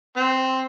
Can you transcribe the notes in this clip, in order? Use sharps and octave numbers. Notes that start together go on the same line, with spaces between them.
C4